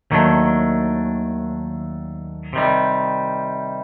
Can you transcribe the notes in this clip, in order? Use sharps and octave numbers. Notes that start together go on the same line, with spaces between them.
D#2 D#3 F#3 A3 D4
C3 D#3 G3